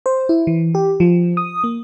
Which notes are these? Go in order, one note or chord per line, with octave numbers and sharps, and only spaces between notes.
C5
E4
E3
G4
F3
D#6
A#3